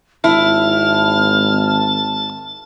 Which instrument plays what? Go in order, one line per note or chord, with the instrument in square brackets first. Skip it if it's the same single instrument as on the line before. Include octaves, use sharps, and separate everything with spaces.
[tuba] G#1 [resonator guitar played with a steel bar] E4 [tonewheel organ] A5 [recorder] F6